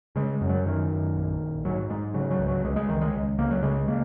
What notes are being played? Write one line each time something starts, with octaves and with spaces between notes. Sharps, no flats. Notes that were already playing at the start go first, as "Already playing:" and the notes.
C#3 G#3
F#2
F#3
F#2 D#3
F#2
A#1
A#1
G#2 F#3
G#2 G#3
C#3 F#3
F#3
C#2
F#3
C#2 G#3
G#3
C#2 D#3
G#3
C#2
C#2 A#3
F#3
C#3 G#3
C#3 A#3